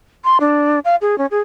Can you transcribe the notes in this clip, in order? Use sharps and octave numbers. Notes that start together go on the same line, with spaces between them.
C6
D4
F5
G#4
C#4
G#4